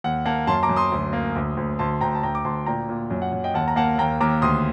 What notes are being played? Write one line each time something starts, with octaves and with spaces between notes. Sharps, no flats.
D#2 F#5
A#3 F#5 A5
F#2 A5 C6
A#5 D6
F#2
C6 D#6
D2
A#3
D2
D2
D2 A5 C6
D2 G5 A#5
A5
D2 G5 A#5
D6
D2 A5 C6
A#2 G5 A#5
A#2
F#2
F#5
F#2
D#5 G5
D#2 F#5 A5
A#5
A#3 F#5 A5
D#2 G5 A#5
D#2 A#5 D6
D2 C6 D#6